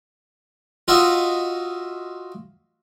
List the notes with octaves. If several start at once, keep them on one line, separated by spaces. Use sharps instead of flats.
F4 F#4 D#5 E5